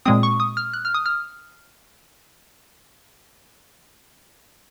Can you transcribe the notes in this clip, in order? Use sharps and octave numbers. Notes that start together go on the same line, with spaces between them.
A#2 G#3 C4 D#6
C#6
D#6
F6
F#6
F6
D#6
F6